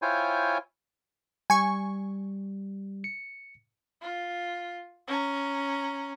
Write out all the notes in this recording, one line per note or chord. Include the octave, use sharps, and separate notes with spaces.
E4 F4 C5 C#5 G5 G#5
G3 G#5 C#6
C#7
F4
C#4 A#5